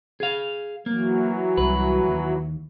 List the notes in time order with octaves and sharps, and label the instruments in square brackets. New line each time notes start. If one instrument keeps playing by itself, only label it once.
[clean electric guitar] G#4 F5
[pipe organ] E3 F#3 [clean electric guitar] A#3
[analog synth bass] C2 [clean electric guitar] B4
[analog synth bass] D#2